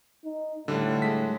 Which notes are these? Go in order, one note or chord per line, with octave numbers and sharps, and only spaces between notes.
D#4
A2 D3 G3 D4
G#3 B6